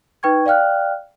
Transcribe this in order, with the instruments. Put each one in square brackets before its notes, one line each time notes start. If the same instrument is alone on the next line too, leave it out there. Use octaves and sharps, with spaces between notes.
[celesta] D#4 B4 G5 C#6 G#6
D5 F5 G5 F6 F#6